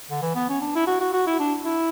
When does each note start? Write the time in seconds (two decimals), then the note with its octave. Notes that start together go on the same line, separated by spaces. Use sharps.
0.10 D3
0.22 E3
0.35 B3
0.49 C#4
0.61 D4
0.75 E4
0.87 F#4
1.00 F#4
1.13 F#4
1.27 E4
1.39 D4
1.65 E4